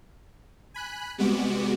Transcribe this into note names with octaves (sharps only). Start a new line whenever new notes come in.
G#5 B5 F#6
C3 G3 G#3 B3 F#4 D6